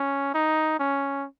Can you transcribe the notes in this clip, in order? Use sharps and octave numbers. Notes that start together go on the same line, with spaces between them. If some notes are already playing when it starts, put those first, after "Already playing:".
Already playing: C#4
D#4
C#4